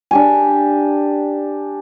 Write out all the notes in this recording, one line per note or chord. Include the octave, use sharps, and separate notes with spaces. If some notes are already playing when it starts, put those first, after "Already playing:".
D4 G4 G#5